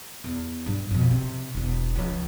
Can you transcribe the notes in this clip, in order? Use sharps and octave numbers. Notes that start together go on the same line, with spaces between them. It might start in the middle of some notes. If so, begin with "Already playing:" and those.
E2
G2 G3
F2 B2
C3
E1 E2
C#2 F3